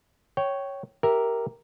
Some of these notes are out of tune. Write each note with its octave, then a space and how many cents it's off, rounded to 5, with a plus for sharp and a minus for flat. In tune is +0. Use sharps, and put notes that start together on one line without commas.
C#5 +0 G5 -20
G4 +0 A#4 +0 E5 +0